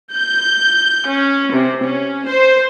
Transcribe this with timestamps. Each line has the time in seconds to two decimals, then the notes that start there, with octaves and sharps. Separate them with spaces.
0.13 G6
1.07 C#4
1.53 C3
1.84 C#4
2.29 C5